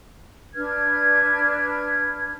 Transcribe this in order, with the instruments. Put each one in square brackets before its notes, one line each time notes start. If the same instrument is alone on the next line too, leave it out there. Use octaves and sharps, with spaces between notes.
[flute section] D4 B4 F6 G#6